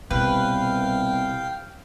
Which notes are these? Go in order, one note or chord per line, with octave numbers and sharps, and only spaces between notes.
C2 B2 B4 F5 G5